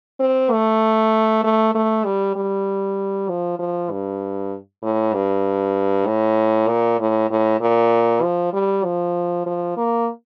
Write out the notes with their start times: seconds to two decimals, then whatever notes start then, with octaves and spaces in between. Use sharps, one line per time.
0.20 C4
0.52 A3
1.44 A3
1.75 A3
2.06 G3
2.36 G3
3.29 F3
3.59 F3
3.91 G2
4.83 A2
5.14 G2
6.07 A2
6.68 A#2
7.00 A2
7.30 A2
7.61 A#2
8.23 F3
8.53 G3
8.84 F3
9.46 F3
9.77 A#3